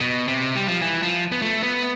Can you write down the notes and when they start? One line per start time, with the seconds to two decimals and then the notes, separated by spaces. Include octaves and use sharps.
0.01 B2
0.28 C3
0.56 G3
0.68 F3
0.82 E3
1.03 F3
1.32 B3
1.42 A3
1.63 B3